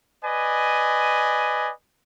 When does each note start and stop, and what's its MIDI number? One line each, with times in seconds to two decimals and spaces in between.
0.24 1.70 71
0.24 1.70 74
0.24 1.70 75
0.24 1.70 80